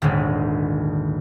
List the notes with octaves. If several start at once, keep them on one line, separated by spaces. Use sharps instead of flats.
D#1 G#1 D3 G#3